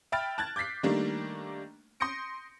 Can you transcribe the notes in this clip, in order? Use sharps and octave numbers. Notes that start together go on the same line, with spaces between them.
E5 G5 B5 F6 A6 D7
A5 F#6 G#6 A6
D6 G6 A6 B6 C7
D#3 G3 A3 A#3 D4
C6 D#6 G6 A#6 C#7 D7